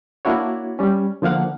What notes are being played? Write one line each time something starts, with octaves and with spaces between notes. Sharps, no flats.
A#3 D4 E4 F#4 C#5
G3 C#4
D3 F3 A#3 F5 F#5